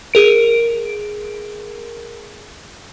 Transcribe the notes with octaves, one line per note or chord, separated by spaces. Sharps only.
G#4 A#4 D7